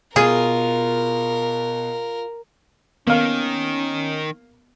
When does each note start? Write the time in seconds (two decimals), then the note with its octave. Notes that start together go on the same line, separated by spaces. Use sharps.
0.16 B2 F4 G#4 A#4 D#7
3.07 D#3 A#3 B3 C#4 F5